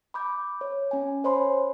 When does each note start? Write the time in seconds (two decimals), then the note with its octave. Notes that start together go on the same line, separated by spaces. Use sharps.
0.14 B5 D6 G6
0.61 C#5
0.91 C#4 G#5
1.24 C5 C#5 G#5 B5 C6